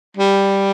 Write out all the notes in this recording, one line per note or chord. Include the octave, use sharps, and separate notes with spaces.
G3